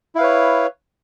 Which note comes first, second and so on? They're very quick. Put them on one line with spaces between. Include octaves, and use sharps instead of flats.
E4 F5 B4 C#5